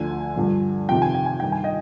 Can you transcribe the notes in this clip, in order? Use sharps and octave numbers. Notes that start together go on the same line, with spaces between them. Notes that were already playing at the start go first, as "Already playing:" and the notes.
Already playing: D2 D3 F3 G#5
G2 D3 F3
F2 C3 D#3 G5
G#5
G5
G#5
G2 D#3 G5
G#5
D#5 G5